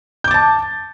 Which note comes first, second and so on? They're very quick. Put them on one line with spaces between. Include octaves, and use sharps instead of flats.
G6 D6 A6 A5